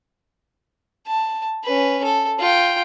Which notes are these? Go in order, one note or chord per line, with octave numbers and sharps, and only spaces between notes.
A5
C#4 B4
A4
F4 G5